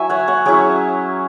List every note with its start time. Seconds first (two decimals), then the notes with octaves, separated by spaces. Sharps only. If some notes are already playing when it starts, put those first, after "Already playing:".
Already playing: F#3 E4 E5 G#5 C#6
0.10 C#5 F#5
0.28 C#5 F#5
0.46 F#3 C#4 E4 G#4 C#5